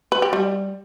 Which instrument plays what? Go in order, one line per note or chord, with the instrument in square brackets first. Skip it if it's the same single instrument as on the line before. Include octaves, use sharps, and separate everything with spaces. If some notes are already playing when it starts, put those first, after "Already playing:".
[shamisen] B4
G4
G3